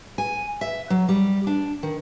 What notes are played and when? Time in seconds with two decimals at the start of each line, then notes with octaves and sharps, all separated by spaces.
0.18 G#5
0.61 E5
0.90 F#3
1.09 G3
1.47 D4
1.83 D#3